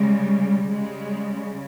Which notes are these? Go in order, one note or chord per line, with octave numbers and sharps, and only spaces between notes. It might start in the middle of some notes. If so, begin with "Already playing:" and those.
Already playing: C#3 G3 G#3
C#3 G3 G#3